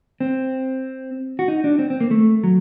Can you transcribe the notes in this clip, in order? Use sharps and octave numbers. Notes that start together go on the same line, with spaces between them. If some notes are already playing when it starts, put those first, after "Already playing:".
C4
F#4
D#4
D4
C4
C4
A#3
A3
F#3